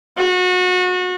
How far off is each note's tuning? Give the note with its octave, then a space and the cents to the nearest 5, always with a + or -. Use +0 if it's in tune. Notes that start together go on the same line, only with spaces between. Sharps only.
F#4 -30